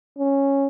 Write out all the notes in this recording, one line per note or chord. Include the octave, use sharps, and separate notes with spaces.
C#4